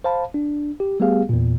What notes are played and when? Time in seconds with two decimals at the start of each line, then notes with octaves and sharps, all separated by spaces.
0.04 C5 F5 A5 B5
0.34 D4
0.80 G4
1.00 G3 A3 B3 G4 G#4 F5
1.29 E2 A#2